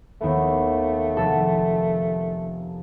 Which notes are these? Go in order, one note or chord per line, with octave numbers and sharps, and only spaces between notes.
D#2 A3 B3
F1 A4